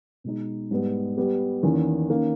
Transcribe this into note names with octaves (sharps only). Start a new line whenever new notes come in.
B2 G#3 D#4
G#2 G3 B3
G3 B3 G4
E2 D#3 A#3 C#4
D#3 A#3 C#4